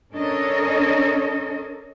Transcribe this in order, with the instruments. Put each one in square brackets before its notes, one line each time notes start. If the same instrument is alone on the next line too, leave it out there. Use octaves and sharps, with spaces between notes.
[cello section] C#4 D4 A4 A#4 C#5 D#5